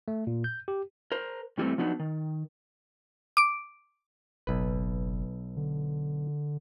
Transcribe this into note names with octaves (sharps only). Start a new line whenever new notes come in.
A3
A#2
G6
G4
A#4 C5
G2 E3 G3 A3 C4
F3 F#3 B3 D4 D#4 B4
D#3
D6 D7
F#1 B1 B4
D3